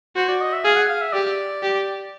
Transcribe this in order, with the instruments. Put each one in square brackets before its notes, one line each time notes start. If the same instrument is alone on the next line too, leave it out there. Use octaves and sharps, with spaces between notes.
[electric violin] F#4 [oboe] C5
[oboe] D5
D#5
E5
[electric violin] G#4 [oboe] F5
[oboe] F#5
F5
E5
[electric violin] G4 [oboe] D5
[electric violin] G4